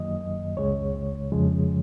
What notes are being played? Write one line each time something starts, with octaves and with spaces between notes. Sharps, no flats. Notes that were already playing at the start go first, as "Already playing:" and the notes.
Already playing: F#2 D#3 F#3 A#3 D#5
C#2 C#3 G#3 C#5
F2 C#3 F3 G#3